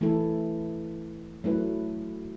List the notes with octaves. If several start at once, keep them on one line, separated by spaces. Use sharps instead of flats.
E3 A3 E4 A4
F#3 A3 E4 B4